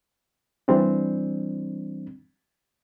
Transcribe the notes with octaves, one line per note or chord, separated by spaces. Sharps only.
E3 G3 C4 D4